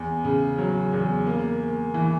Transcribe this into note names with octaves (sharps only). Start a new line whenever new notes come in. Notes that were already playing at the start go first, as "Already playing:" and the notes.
Already playing: E2
C#3
F#3
E2
A#3
A#3
E3